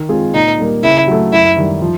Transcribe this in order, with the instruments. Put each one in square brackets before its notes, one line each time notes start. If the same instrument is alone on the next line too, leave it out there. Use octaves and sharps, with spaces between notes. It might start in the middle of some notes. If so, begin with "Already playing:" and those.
Already playing: [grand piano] D#3
G#3 C4 F4 G#4
[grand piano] A#2 [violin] D#4
[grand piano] G3 A#3
[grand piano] C#3 [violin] E4
[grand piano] F#3 A3
[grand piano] F#2 [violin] E4
[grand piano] D#3 G3
F3